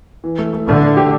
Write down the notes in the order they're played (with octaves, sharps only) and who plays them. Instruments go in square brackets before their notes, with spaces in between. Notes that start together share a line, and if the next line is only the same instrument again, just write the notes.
[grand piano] E3
A3
A3
[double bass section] D3 [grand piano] A3
[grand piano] A3
G4